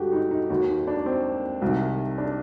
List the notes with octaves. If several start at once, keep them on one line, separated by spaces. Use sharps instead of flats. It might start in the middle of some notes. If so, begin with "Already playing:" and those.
Already playing: G2 D3 F#4 G4
D#4
D#4
D#2 D#3 F#4
D#4
D4
C4
C2 C3 D#3
D4